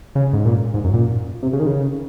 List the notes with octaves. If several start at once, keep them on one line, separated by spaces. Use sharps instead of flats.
C#3
G#2
A#2
G#2
F#2
A#2
C3
C#3
D#3
C#3